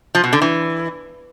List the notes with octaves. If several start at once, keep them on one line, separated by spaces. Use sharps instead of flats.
F3
B2
D3
E3